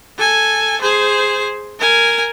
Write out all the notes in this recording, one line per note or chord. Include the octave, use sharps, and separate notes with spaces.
A4 G#5
G#4 C5
A#4 G#5